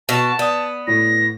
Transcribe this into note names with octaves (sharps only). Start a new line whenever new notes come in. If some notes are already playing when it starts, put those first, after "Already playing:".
B2 F#4 A5
B3 D5 D#6
A2 A#6